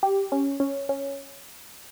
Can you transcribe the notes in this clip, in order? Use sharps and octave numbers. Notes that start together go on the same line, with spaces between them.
G4
C#4
C#4
C#4